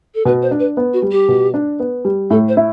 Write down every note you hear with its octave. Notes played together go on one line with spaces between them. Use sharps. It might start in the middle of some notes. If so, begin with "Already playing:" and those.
A4
B2 B4
C5
D4
B4
B3
F#4
G3
G4
B2
D4
B3
G3
A2 A4
C5
E4